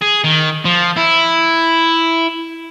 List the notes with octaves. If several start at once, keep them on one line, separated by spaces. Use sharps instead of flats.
G#4
D#3
F3
E4